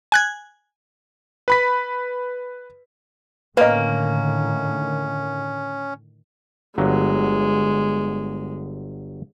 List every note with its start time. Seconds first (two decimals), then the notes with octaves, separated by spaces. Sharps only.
0.12 G#5 F#6 G#6
1.48 B4 B5 B6
3.57 A2 D3 D#3 A#3 C#4 B4 D#5
6.78 G1 F#3 G#3